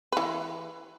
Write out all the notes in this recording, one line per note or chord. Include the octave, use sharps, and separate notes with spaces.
E3 B4